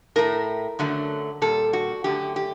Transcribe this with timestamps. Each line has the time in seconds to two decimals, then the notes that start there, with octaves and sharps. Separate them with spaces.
0.16 A2 A3 A#4
0.79 F#2 D3 F#3 A3
1.42 A#2 G3 A4
1.73 F#4
2.04 F#2 D3 A3 G4
2.36 G4